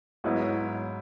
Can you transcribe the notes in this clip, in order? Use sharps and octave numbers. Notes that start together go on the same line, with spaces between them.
G#2 F#3 B3 E4